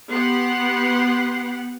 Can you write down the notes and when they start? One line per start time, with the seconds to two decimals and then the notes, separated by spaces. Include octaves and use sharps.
0.11 B3 G4 F#5 C6